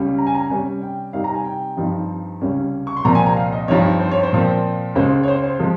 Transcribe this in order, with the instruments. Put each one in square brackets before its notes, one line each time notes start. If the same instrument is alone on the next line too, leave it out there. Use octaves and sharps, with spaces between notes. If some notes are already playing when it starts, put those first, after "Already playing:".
Already playing: [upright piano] C#2 C#3 G3 C#4
A#5
G#5
A#5
C3 G3 C#4 G#5
G5
C3 G3 C4 D#4 F5
A#5
G#5
G5
G2 F3 C4 D#4
C#2 C3 G3 C#4
C#6
C6
C2 A#2 F3 C4 A#5
G#5
A#5
F5
D#5
G2 F3 C4 D#4 C#5
C5
C#5
C5
A#2 F3 C4
C#2 C#3 G#3 C#4 C5
C#5
C5
C5
C3 F3 G#3